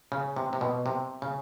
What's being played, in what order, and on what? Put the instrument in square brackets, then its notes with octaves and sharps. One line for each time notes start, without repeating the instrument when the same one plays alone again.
[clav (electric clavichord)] C#3
C3
C3
B2
C3
C#3